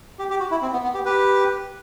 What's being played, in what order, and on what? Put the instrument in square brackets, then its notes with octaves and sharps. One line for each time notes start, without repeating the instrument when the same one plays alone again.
[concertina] G4
G4
F#4
E4
C4
B3
B3
G4
G4 B4